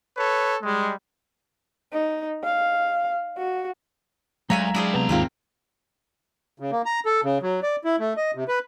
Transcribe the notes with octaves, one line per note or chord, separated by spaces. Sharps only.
A4 B4 C#5
G3 G#3
D#4
F5
F#4
D2 F#3 G#3 C#5 E5 F5 G#5 A#5
G3 D4 E4 G#4 C5
C3 F3 B3 A#5
D#2 G#2 C3 A#3 C4 F4
C#3
A#3
A#5
A4
C#3
F#3
D5
E4
A3
D#5
C3
B4